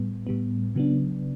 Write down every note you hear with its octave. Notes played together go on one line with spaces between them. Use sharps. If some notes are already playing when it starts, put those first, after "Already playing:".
Already playing: A2 G3 B3
A2 G3 B3
C#3 F#3 B3 D4